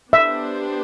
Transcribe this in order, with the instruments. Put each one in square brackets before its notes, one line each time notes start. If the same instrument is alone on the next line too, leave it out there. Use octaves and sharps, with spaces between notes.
[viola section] B3 D4 G4 C5 [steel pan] E5